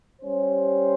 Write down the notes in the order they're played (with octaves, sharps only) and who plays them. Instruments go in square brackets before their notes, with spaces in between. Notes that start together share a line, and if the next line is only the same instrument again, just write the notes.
[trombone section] G3 C#4 G4 C5